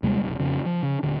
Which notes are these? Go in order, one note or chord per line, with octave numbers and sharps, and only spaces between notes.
D#2 C3 G3 G#3
F1 B1
F2 C#3 F3
F3
C#3
D#1 D3